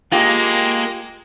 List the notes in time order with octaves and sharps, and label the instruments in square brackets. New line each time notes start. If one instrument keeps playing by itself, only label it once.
[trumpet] G#3 [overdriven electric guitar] A#3 [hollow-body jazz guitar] F4 G4